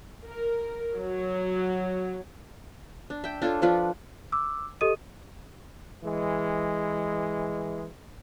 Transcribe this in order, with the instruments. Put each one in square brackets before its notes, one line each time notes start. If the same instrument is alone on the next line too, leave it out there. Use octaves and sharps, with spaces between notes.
[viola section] A#4
F#3
[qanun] D4
E5 G5
D4 F4 A4 C#5
F3 D4 F4 B4
[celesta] D6 E6
G4 A4 D#5 D#6 D#7
[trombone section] E3 G#3